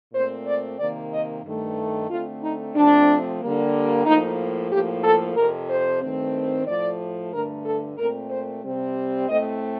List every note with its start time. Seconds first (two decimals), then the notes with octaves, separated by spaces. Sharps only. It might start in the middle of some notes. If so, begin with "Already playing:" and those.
0.13 A#2 A3 C4 C5
0.47 D5
0.78 C3 D#3 A#3 D5
1.12 D#5
1.44 G2 D#3 A3
2.09 D3 A3 C4 F4
2.42 D#4
2.75 C3 F3 A3 C4 D4
3.41 D3 G3 A#3
4.05 A2 F3 A#3 D#4
4.71 A2 F3 A#3 G4
5.04 A4
5.36 F2 C3 F3 A#4
5.69 C5
6.02 G2 D#3 A3 C4
6.67 A2 F3 A3 D5
7.32 G2 D3 A3 A#4
7.66 A4
7.98 A#2 A3 C4 A#4
8.31 C5
8.64 C3 G3 C4
9.28 A2 A3 C4 D#5